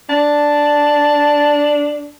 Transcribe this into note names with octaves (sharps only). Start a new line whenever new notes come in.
D4 A5